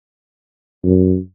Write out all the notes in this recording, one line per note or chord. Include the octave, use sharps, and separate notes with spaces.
F#2